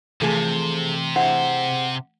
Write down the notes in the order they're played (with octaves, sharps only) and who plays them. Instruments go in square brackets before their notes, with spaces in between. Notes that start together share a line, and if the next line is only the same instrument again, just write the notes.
[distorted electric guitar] C3 [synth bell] E3 A3 [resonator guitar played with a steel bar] F3 G#4 A4
[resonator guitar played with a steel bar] E4 G#4 C5 [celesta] F#5